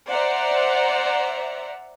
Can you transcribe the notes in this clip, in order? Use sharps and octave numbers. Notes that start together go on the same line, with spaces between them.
C5 D5 E5 F#5 A#5